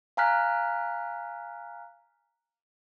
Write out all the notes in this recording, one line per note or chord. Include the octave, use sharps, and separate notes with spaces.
F5 G#5 A#5 F6 F#6 B6